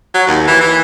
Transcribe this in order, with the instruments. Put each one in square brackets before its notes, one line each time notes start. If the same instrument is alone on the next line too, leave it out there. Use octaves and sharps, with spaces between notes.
[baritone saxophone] F#3
D#2
E3
E3